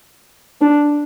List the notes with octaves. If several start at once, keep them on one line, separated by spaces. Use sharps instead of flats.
D4